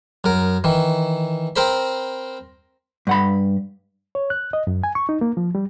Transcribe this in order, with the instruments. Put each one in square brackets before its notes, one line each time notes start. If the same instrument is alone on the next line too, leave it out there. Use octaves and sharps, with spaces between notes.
[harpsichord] F#2 A#4
D#3 E3
C4 A#4 C5 B5
[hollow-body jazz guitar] G2 F#5 B5
[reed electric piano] C#5
F#6
D#5
F#2
G#5
C#6
D#4
A#3
F3
G3